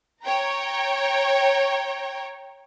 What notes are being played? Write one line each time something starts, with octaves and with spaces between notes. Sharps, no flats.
C#5 G5 A#5